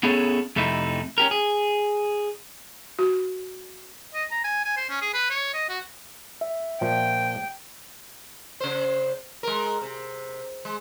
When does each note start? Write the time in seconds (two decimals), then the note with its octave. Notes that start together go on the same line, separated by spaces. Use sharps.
0.03 B3 C#4 E4 G#4 A4 C#5
0.56 F2 C3 A3 D#4 E4
1.18 C#4 G4 A#4
1.31 G#4
2.99 F#4
4.14 D#5
4.31 A#5
4.44 G#5
4.64 G#5
4.77 C5
4.89 C#4
5.01 G#4
5.13 B4
5.30 C#5
5.54 D#5
5.69 F#4
6.41 E5
6.81 A#2 F3 G5
8.60 C#3 C5
9.43 G#3 A#4
9.82 C3
10.65 G#3